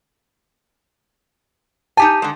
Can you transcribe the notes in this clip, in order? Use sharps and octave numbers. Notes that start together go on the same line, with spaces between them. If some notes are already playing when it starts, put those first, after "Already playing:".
D#4 G4 G#5 A5
D3 G#3